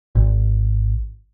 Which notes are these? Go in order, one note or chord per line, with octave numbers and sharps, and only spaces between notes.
G#1